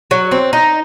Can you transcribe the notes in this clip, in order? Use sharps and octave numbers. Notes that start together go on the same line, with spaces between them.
F#3
C4
D#4